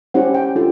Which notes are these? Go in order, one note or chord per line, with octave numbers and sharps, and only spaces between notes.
C#4 E4 G4 C5 F#5
G5
D4 F4 A4